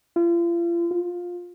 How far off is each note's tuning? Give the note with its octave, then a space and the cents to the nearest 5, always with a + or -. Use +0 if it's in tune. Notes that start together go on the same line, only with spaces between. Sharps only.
F4 -40
F4 +15